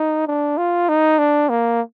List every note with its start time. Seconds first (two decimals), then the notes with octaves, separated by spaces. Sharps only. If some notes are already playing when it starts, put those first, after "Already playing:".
Already playing: D#4
0.27 D4
0.58 F4
0.88 D#4
1.19 D4
1.49 A#3